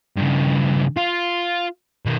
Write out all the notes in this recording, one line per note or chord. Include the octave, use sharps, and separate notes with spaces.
G2 C#3
F4
B2 D#3